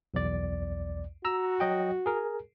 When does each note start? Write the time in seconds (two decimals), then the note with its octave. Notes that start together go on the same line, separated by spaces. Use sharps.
0.14 B1 E2 D5
1.25 F#4 A#5 E6
1.60 F#3 D#5 G5
2.06 G#4 A#4